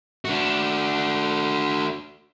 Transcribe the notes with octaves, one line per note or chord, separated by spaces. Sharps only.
D4 F#4